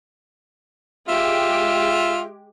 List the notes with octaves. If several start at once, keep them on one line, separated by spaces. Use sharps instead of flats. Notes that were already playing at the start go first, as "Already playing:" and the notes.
G#3 F4 G4 E5